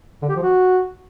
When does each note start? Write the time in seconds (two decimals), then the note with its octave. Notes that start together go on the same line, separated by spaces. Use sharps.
0.22 D3
0.29 G4
0.36 F3
0.43 F#4